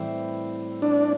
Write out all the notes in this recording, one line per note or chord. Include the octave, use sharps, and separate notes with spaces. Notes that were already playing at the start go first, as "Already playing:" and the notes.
Already playing: A2 E3 G3 C4 E4
D4